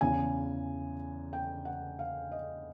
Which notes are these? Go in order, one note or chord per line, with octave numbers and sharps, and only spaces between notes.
E2 C#3 E3 G#5
G5
F#5
F5
D#5